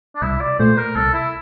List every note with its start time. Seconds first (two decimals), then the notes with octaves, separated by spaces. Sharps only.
0.15 D4
0.22 C2 E4
0.41 D5
0.59 A#2 A3 C5
0.77 A#4
0.96 C2 A4
1.13 E4